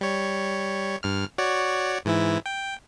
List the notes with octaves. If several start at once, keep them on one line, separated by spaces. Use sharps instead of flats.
G3 C#5
G2 F6
F#4 C#5 D5
G#2 E3 E4
G5